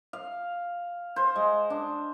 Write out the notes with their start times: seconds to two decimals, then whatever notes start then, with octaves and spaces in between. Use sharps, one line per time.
0.13 F5
1.16 C5
1.36 G#3
1.70 D4